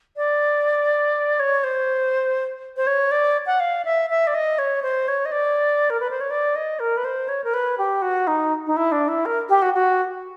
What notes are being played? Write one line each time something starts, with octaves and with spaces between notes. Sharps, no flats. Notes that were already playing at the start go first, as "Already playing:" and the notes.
D5
C#5
C5
C5
C#5
D5
F#5
F5
E5
E5
D5
D#5
C#5
C5
C#5
D#5
D5
A#4
B4
C5
C#5
D5
D#5
A#4
B4
C5
C#5
A#4
B4
G4
F#4
D#4
D#4
E4
D4
E4
A#4
G4
F#4
F#4